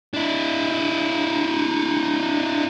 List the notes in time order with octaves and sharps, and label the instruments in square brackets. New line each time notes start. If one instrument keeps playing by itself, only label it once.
[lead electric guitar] D4 E4